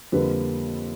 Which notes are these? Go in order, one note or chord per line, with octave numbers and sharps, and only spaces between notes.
F2 D3 G3 A#3 B4